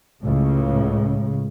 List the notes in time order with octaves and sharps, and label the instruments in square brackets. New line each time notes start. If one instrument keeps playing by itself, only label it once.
[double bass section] C#2 A2 C#3